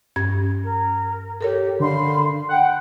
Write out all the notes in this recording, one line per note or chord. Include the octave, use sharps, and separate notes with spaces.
G2 C#4 G#6
A#4
G4 A4 A#4 C#5
D3 F5 B5 C6
F#5 G5